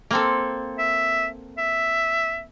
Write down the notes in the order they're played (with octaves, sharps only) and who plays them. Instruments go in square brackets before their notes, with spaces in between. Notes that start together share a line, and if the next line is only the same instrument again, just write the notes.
[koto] A#3 C4 A4
[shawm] E5
E5